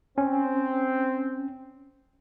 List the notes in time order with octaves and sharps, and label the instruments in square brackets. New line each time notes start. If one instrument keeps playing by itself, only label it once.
[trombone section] C4 [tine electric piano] C#4